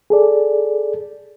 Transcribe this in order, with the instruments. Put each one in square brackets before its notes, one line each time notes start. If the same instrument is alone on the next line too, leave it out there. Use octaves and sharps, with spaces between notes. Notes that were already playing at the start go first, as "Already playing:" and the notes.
[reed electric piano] G#4 A4 D5